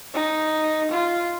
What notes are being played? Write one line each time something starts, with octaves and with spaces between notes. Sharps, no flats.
D#4
F4